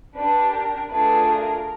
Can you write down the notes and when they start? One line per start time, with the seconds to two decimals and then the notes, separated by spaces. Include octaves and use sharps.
0.16 D4 G4 B4
0.54 A#4
0.91 A3 D4 F4 G#4 B4
1.29 A#4